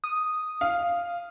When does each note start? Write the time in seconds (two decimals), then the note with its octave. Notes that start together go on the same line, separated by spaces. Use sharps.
0.04 D#6
0.61 F5